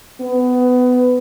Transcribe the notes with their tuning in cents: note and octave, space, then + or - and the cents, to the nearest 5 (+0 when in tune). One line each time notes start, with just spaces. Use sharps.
B3 +20